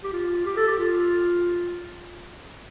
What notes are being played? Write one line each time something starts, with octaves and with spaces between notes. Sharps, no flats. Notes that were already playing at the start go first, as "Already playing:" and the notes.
G4
F4
G4
A4
G4
F4